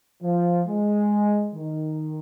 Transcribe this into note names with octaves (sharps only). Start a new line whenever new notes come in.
F3
G#3
D#3